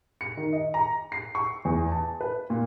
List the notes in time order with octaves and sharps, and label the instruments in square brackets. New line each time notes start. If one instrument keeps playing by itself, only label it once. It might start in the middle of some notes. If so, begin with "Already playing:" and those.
[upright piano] C#7
D#3
D#5
A#5
C7
C#6
E2
A5
B4
A#2